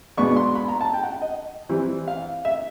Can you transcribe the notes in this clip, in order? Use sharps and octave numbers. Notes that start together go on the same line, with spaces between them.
B2 G#3 B3 D4 C#6
C6
B5
A#5
A5
G5
F#5
D#5
E3 G3 C4
F5
E5